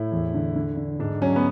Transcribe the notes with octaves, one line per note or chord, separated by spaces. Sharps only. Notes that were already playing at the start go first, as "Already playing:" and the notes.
Already playing: A2 E4
E2
D3
D3
D3
G#2 D4
F#3 C#4
B3